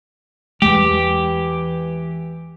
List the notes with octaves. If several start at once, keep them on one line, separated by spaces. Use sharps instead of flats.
E2 E3 G#3 G4